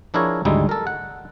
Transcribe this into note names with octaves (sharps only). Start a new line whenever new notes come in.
F3 D4 E4 G#4 A#4 C#5
G#1 D2 G3 G#3 D#4 E4
A4 A#4
F#5